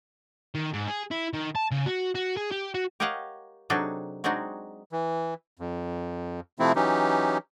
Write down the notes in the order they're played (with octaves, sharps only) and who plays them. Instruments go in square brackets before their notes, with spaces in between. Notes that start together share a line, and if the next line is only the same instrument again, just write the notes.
[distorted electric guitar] D#3
G#2
G#4
E4
D#3
A5
C#3
F#4
F#4
G#4
G4
F#4
[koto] G4 A#4 C#5 D#5 F5 F#5
C3 F#3 D4 D#4 G#4 A4
F#3 G#3 C4 D4 D#4 F#4
[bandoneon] E3
F2
C3 F3 A3 C4 E4
E3 F#3 C#4 D#4 G4